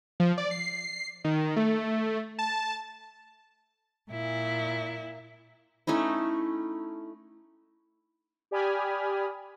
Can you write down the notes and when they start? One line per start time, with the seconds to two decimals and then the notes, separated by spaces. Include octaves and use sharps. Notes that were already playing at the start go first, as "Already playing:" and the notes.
0.20 F3
0.38 D5
0.51 C7
1.24 D#3
1.56 A3
2.39 A5
4.10 A#2 E4
5.87 A3 C#4 D#4 E4
8.51 G4 D5 G#5 B5 D#6 F6